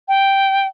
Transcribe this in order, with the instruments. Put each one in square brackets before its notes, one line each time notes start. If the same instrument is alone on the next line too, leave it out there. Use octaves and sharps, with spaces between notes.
[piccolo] G5